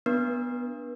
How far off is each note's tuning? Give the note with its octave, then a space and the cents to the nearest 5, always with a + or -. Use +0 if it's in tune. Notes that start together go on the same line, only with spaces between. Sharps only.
B3 +0 D4 +0 B4 -40